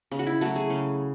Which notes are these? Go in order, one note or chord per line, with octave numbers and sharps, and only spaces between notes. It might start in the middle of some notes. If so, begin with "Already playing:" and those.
C#3
F#4
E4
F#3 A3 F#4
G#4
C#3